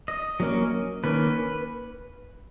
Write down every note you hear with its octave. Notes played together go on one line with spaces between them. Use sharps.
D#5
F#3 A#3 C#4
D#3 A#3 C#4 B4